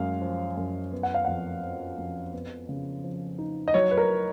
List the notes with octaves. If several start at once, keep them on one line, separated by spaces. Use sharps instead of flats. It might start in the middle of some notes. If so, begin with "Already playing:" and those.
Already playing: F#2 G#3 F5
F3
F#2
B3
F#5
F5
F2 F#5
F3
F2
B3
C#3
F3
D#4
D#5
F#3 C#5
B4
A#4